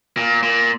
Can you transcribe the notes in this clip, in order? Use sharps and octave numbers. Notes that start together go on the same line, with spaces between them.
A#2
A#2